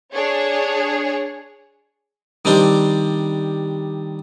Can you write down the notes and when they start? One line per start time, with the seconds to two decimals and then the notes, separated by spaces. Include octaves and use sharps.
0.15 D4 G#4 C#5
2.45 D#3 G3 C4 D4 C5